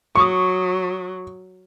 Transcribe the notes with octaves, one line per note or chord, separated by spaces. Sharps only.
F#3 C#6 D#6